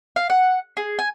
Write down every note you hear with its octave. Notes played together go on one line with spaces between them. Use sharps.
F5
F#5
G#4
G#5